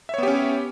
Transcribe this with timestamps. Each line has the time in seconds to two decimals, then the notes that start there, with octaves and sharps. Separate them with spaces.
0.09 E5
0.14 C#5
0.18 B3
0.23 G4
0.28 C#4